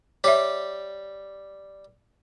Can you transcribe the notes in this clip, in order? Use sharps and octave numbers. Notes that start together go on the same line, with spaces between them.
G3 G4 C#5 E5